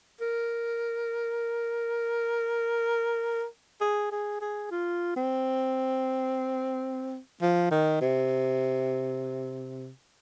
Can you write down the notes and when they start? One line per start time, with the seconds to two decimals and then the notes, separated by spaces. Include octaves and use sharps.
0.21 A#4
3.81 G#4
4.11 G#4
4.41 G#4
4.71 F4
5.16 C4
7.41 F3
7.71 D#3
8.01 C3